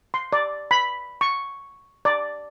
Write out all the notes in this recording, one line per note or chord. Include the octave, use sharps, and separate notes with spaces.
C6
D5
B5
C#6
D5